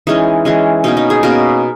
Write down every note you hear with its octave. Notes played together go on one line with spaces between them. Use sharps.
E3 G#3 C#4 D#4
E3 G#3 C#4
B2 A#3 C#4 D#4
D#4
G#4
B2 A#3 C#4 A#4